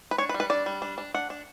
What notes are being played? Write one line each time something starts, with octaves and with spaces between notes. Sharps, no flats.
B4
D4 C#5
B4
G3
B4
D4 D5
G3
D4
D4
D4 F#5
D4